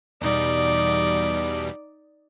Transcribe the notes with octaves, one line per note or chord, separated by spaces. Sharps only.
E2 B2 G3 D#4 D5